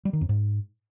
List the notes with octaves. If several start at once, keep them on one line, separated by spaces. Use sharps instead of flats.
G3
D#3
F2
G#2